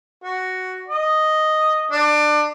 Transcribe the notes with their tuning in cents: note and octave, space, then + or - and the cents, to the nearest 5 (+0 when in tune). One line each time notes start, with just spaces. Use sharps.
F#4 +5
D#5 +0
D4 +25